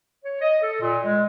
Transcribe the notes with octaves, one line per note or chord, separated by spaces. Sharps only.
C#5
D#5
A4
A#2
G#3